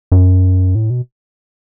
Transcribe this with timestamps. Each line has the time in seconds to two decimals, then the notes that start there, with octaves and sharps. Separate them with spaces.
0.12 F#2
0.75 A2
0.90 B2